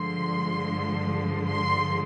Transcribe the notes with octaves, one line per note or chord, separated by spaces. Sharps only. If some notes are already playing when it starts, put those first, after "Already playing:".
Already playing: G2 D3 F3 G#3 C6
C6